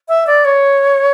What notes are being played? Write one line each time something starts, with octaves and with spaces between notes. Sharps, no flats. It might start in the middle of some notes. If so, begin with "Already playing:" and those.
E5
D5
C#5